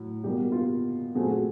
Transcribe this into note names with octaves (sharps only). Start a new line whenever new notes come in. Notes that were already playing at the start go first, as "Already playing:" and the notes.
Already playing: A2 F#3
B2 G3 A#3 G4
F#4
F4 G4
A#2 F#3 A3 C4 F#4 G#4
F#4 G#4